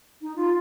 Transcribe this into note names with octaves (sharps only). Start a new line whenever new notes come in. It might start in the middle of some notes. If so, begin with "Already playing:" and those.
D#4
F4